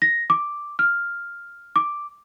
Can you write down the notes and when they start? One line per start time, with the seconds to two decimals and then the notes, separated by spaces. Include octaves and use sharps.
0.02 A#6
0.30 D6
0.79 F6
1.76 D6